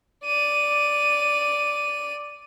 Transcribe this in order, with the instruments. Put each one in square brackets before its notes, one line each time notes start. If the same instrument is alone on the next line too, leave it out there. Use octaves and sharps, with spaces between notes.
[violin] D5 D#7